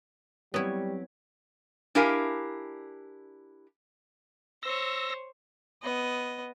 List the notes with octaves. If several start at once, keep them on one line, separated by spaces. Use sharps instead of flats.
F#3 G3 B3 C4 E4 G4 C#5
D4 E4 G4 A#4 F5 G#5
C5 C#5 E6 A#6
B3 D#5